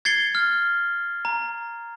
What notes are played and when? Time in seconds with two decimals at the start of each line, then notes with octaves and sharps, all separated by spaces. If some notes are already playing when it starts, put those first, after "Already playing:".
0.05 G#6 A6 C7 C#7 G7
0.35 F6
1.25 A#5